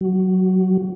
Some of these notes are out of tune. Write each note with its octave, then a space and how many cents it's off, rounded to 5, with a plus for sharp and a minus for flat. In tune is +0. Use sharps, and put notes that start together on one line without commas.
F#3 +10